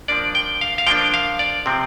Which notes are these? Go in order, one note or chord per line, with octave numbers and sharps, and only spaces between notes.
F3 A#3 D4 D5
G5
F5
F5
F3 A#3 D4 G5
F5
D5
C3 F3 C4